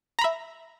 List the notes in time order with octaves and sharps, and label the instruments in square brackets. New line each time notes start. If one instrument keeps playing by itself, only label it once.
[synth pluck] A#5
B5
E5